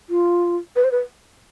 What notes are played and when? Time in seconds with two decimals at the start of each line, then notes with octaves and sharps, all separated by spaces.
0.10 F4
0.76 B4
0.84 C5
0.92 B4